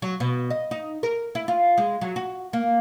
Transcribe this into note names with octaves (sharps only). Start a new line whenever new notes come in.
F#3
B2
D#5
D#4
A#4
E4
F4
G#3
F#3
F#4
A#3